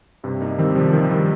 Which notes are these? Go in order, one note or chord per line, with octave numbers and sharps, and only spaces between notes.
G2 C3
A#3 D#4
D#3 G3 C4
C3 F3
A#2 D#3
D#3 G3